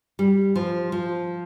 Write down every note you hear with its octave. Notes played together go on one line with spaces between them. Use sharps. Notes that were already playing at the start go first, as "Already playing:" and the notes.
G3
F3
F3